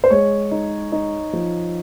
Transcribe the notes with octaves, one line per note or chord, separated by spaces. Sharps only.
C5
G#3 C#5
D#4
D#4
F3